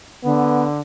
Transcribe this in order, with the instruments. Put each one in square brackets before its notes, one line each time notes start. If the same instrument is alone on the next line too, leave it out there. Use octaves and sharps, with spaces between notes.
[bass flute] D3 [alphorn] B3